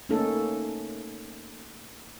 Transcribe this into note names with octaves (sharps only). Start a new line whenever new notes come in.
A3 A#3 C#4 D#4 A4